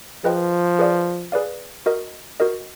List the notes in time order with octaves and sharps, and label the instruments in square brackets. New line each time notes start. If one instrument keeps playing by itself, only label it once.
[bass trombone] F3 [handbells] G#4 B4 D#5 G5
[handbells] G#4 B4 D5 F5
G#4 B4 D5 F5
F#4 A#4 D#5
F#4 A#4 D#5